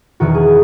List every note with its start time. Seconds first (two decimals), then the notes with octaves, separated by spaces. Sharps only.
0.20 E1 E2 D#3 F#4
0.35 G#4